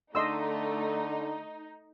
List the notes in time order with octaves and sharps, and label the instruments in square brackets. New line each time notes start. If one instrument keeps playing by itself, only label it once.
[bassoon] D3 [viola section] A3 [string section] D#4 [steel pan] D#5 C6 E6